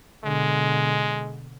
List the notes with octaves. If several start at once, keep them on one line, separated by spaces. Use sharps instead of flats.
B2 D3 G#3